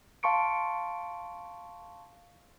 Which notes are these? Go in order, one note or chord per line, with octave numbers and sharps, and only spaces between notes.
F5 A5 C6 C#6 C#7 D7